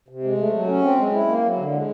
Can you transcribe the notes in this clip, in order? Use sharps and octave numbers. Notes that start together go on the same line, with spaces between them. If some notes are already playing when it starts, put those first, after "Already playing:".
C3
G#3
A3
F#3
C#4
C4
G#3
E4
A#3
F#3
D3
G#3